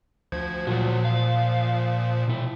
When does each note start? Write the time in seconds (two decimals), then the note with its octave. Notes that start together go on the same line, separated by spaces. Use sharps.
0.32 D2 F3 G#6
0.67 A#2 F3 F#3 F4 F#4
1.05 F5
2.28 B2 E4